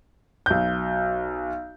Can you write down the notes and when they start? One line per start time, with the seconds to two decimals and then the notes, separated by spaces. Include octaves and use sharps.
0.46 B1 G6